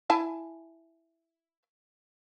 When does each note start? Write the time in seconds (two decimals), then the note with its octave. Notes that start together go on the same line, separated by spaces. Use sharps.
0.10 E4 G#5 A5